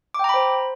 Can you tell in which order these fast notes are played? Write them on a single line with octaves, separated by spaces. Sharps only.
D6 G5 A#5 B5 C5